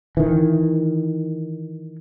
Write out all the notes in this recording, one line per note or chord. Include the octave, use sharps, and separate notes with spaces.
D#3 E3